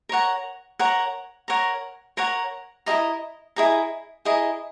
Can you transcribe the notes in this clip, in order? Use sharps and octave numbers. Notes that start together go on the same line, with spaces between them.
A#4 C#5 F#5 A#5
A#4 C#5 F#5 A#5
A#4 C#5 F#5 A#5
A#4 C#5 F#5 A#5
E4 G#4 D#5 A#5
E4 G#4 D#5 A#5
E4 G#4 D#5 A#5